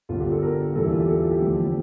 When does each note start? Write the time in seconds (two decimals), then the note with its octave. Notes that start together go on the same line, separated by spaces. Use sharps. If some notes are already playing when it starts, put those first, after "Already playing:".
0.09 G1 G2 D3 F4
0.20 G4
0.31 A4
0.42 A#4
0.75 E2 E3 G3 A4
0.83 E4
0.92 F4
1.00 G4
1.08 A4
1.20 F4
1.31 G4
1.42 E2 D3 F3 A3